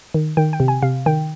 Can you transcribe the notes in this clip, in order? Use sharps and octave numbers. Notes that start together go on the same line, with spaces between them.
D#3
D#3 G5
G5
C3
G#5
C3 F5
D#3 G5